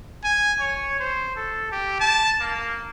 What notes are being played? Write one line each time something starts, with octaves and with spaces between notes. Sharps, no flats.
G#5
C#5
C5
A4
G4
A5
A#3